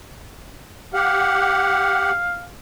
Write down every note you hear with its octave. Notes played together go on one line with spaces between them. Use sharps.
G4 F5 F#5